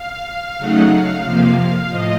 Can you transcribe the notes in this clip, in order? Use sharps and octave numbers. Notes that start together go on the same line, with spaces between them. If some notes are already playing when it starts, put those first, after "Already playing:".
Already playing: F5
C#3 F#3 A3 D#4 F#5
F5
F2 C3 F3 A#3
F5
A2 F3 D#5